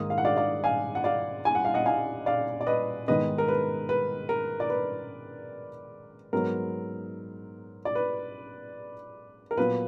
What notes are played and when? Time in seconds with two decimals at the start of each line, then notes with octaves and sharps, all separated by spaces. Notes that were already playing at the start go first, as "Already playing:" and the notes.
Already playing: G#2 D#3 A#3 D#6
0.10 F5
0.18 F#5
0.25 D5 F5
0.36 D5 F5
0.64 F5 G#5
0.95 F#5
1.04 D5 F5
1.45 G#5
1.55 F#5
1.65 F5
1.74 D#5 F#5
1.86 F5 G#5
2.26 D5 F5
2.61 D5
2.67 B4 D#5
3.08 G#2 D#3 G#3 B3 B4 D#5
3.38 A#4
3.48 B4
3.89 B4
4.29 A#4
4.60 D5
4.70 B4
6.33 G#2 F#3 B3 A#4
7.85 D5
7.95 B4
9.51 A#4
9.57 A#2 F#3 B3 B4